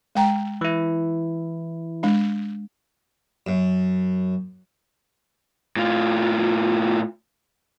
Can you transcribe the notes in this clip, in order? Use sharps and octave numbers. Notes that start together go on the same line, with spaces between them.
G#3 G5 A#5
E3 E4
G#3 D4
F#2
A2 F4